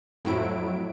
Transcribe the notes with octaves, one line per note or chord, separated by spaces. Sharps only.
F2 A2 F#3 E4 D7